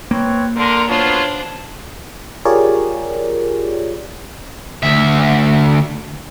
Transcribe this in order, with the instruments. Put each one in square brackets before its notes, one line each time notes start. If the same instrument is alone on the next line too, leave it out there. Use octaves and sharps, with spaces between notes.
[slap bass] A#3 [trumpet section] C4 B4 C#5
[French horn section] D3 A#4 [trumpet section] C6
[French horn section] F#3 B3 F4 [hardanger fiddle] D4 C5 [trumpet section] C#5
[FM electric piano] F4 G4 G#4 A#4 C#5 D5
[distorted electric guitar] D2 E5